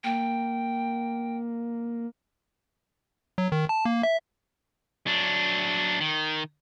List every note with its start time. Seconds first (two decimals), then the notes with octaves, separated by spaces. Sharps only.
0.04 A#3 G5
3.38 F#3
3.52 D#3
3.69 A5
3.85 A#3
4.03 E5
5.07 F#3 D4
6.01 D#3